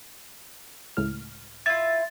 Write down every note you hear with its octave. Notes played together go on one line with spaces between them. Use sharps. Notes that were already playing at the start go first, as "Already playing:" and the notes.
C#2 A2 F6
E4 F4 A6